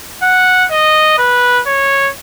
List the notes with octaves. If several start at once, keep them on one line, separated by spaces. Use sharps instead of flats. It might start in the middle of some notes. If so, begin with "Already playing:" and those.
F#5
D#5
B4
C#5